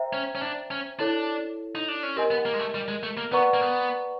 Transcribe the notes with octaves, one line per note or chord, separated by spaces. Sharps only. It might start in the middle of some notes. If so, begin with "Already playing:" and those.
Already playing: C5 E5 G5 A#5
C#4
C#4
D4
C#4
D4 E4 A4 C#5
D#4
D4
C#4
C4 G4 A#4 D#5 G#5
B3
A#3
G#3
A3
G3
G#3
A3
A#3
B3 B4 D5 F#5 A#5 C#6
A#3
B3